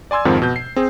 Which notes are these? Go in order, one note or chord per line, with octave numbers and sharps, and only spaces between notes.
D5 G#5 C6 E6 G#6
F2 G#2 D#3 F3 C4
B2 G6
C7
C4 G#4